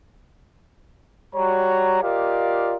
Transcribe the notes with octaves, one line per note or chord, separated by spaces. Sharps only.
G3 F#4 C#5 A#5
F4 G4 A#4 D5 D#5 F5